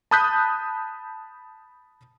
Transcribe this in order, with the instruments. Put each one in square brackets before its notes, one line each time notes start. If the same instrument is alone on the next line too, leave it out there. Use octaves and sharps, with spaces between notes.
[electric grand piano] A5 B5 D#6 F#6 G6 B6